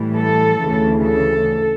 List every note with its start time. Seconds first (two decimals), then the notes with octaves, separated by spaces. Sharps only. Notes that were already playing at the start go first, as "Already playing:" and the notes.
Already playing: A2 E3 G3
0.18 A4
0.61 D2 C#3 E3 A3
1.03 A4